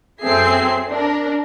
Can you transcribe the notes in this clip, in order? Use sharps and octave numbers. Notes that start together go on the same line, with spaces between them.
F#2 C4 G#4 A4 E5 C7
D4 A#4